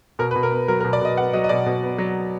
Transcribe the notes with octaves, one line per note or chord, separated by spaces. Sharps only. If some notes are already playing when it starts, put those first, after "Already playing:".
B2 A#4
B4
B2
A#4
B3
F#3 A#4
A#4
B2
D5
B2 D#5
B3 F#5
F#3 D#5
D#5
B2 D5
B2
B3
F#3